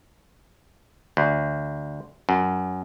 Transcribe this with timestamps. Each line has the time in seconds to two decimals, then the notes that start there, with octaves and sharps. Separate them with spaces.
1.17 D2
2.29 F#2